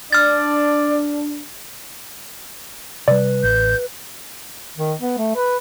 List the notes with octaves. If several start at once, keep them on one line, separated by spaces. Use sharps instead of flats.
D4 D5 F6 A6
C3 G3 B4 D5
A1 G6
D#3
B3
A3
B4